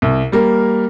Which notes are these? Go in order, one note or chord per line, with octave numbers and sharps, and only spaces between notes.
C2
G3 A#3 A#4